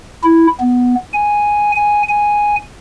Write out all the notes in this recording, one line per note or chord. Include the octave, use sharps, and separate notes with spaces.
E4
B3
G#5
G#5
G#5